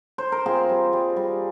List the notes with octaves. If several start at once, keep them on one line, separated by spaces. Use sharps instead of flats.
C5
A#4
C4 F4 G#4
G3
G3
G3